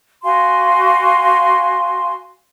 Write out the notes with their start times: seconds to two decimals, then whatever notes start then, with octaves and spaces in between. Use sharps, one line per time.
0.24 F#4 F5 G#5 C6